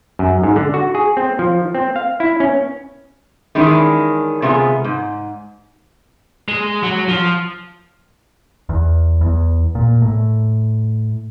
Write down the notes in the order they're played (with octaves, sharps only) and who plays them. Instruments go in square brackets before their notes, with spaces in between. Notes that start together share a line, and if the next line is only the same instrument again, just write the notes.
[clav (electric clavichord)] F#2
G#2
D3
F#4
G#4
C4
F3
C4
F5
E4
C#4
[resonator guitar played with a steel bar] D#3 E3 G#3 C#4 D4
C3 G#3 B3 F4 G#4
G#2
[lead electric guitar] G#3
F#3
F3
[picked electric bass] E2
E2
A#2
A2